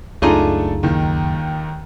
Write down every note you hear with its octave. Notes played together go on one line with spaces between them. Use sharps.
C#2 F#2 A3 D4 D#4 F4 G#4 A4
D#2 D#3